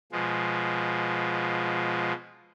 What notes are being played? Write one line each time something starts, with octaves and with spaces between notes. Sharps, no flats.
B2 F3 G#3